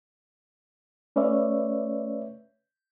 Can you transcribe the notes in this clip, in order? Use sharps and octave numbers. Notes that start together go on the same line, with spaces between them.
A3 C#4 B4 C#5 D5 E5